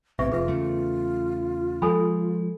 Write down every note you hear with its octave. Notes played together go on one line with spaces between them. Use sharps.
B1 A2 C3 C4 B4 E5 C#6
F1 F4 G#4 B4 E5
E2 C#3 A3
F3 G#3 A4 G#5 B5